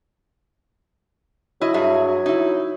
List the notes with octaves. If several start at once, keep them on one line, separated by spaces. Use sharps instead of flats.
F#3 E4 D#5
G2 G#4 E5
D#4 E4